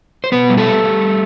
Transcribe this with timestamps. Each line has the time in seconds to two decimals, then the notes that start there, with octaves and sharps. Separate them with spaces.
0.24 C5
0.32 B2 B3 B4
0.50 G3
0.57 A3 A4
0.66 G3
0.83 G3